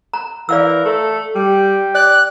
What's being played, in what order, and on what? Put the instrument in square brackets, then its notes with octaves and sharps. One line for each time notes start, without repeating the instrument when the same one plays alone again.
[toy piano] A#5
[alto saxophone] E3 [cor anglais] A#4 [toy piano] D5 F5 E6
[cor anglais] A3 [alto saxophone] A4
[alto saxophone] G3 [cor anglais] G4
[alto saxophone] D5 [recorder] F#6